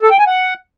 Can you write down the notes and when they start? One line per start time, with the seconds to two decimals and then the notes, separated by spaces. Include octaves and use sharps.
0.03 A4
0.11 G5
0.19 G#5
0.27 F#5